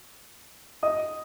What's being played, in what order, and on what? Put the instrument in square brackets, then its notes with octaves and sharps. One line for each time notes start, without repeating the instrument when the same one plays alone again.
[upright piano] D#5 D#6